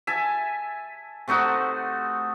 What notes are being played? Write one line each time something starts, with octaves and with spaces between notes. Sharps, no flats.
E5 G#5 A5
C3 A3 D#4 F#4